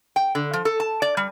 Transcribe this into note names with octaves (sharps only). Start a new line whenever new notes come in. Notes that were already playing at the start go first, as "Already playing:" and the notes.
G5
D3
F3
A4
A5
D5
G3